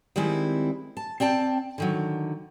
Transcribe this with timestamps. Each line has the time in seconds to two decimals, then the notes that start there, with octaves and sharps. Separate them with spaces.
0.16 D#3 G3 G#3 C4 E4
0.97 A5
1.20 C4 D5 G5 A5
1.78 D3 D#3 F#3